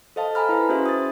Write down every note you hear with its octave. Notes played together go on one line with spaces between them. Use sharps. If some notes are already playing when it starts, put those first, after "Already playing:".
A4 C5 D#5 F5 A5
G#5 A#5 B5 F6
E4 B4
C#4 F#4 G#4 C5 E5
D#6 A6